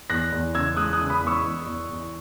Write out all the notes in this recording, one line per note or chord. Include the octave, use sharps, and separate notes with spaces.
E2 F#6 A#6
E2
C#3 E6 G#6
G#3 D#6 F#6
D#6 F#6
C#3
B5 D#6
E2
C#6 E6
E2
E2
E2